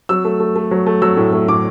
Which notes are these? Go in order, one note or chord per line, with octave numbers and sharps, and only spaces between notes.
F#3 E6
A3
A3
A3
F#3
A3
F#3 E6
A2
A3
A2 D6